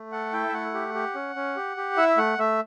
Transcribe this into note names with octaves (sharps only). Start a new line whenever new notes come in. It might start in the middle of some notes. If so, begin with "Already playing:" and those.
Already playing: A3
A4 F#5
E4 G5
E5
A3 F#5
G4
G4
C#4
C#4
G4
G4
E4 E5
A3 F#5
A3 E5